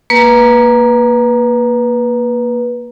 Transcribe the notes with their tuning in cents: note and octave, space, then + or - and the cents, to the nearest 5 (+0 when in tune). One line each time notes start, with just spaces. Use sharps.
A#3 +5 B4 -15